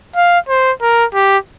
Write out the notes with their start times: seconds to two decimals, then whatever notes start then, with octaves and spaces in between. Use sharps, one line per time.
0.16 F5
0.49 C5
0.82 A#4
1.14 G4